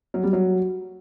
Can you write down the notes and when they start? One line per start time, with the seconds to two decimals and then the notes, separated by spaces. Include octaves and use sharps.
0.14 F#3
0.23 G3
0.33 F#3